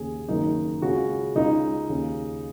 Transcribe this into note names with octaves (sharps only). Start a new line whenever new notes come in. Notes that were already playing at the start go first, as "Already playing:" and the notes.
Already playing: D#2 C#3 G#4
F#1 F#2 D#3 D#4
C#2 C#3 F#4
C#2 C#3 D#4
D#2 C#3